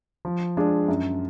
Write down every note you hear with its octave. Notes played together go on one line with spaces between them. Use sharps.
F3
G#3 D4 F4 G#4
F#2